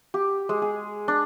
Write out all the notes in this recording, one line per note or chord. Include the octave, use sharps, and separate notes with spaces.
G4
G#3
G#4
D4